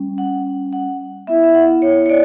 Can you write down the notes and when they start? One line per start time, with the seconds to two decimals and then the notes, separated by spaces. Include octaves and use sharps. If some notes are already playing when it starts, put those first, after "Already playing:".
Already playing: G3 C#4
0.18 F#5
0.73 F#5
1.27 B3 E4 E5
1.43 E5
1.55 F#5
1.82 C#5
2.06 C#5
2.10 D5